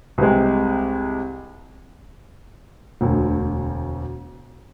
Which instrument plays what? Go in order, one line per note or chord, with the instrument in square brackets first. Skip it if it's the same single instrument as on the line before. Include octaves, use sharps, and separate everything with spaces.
[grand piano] C2 C3 G#3
E1 D2 D3